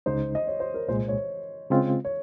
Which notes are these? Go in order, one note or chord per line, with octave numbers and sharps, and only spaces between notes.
C#2 C#3 G#3 D#4 C5
D#5
C#5
C5
A#4
C2 A#2 G#3 C5
C#5
C#3 G#3 C4 F4
C#5